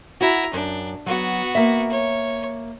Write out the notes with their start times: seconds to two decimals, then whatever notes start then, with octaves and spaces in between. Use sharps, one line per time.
0.21 E4 F#4 A#5
0.53 F#2 D4
1.06 F#3 B3 F#4
1.55 A#3 E5
1.92 C#5